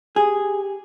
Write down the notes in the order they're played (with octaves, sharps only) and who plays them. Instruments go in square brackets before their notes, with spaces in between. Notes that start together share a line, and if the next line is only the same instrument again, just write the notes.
[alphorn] G4 [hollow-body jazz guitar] G#4